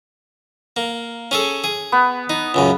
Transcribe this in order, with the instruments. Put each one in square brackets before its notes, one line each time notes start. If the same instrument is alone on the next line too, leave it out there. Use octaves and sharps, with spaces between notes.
[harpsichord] A#3
C#4 G#4 A4
G#4
[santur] B3
[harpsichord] D#4
C#2 F#2 C#3